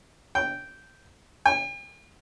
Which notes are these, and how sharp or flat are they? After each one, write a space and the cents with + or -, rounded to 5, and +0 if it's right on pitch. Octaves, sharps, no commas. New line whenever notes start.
G5 -10
G5 +45